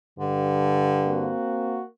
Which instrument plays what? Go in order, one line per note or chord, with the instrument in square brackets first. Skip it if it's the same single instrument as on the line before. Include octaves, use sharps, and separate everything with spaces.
[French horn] G2 [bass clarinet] D3
[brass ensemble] A#3 C4 F#4